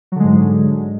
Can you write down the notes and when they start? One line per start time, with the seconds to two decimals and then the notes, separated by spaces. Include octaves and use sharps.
0.12 F#3
0.16 D3
0.20 G#3
0.24 G#2